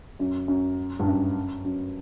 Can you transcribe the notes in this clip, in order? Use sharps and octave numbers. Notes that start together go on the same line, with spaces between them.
F#2
F#2
G2
F#2
F#2